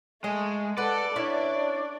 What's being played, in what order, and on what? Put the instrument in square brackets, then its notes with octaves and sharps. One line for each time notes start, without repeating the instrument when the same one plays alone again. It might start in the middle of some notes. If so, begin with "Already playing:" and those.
[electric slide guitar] G#3 [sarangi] A3 [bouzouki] D#5
[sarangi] A4 [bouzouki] B4 F#5 [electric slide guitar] D5
[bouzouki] C#4 E4 [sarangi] D4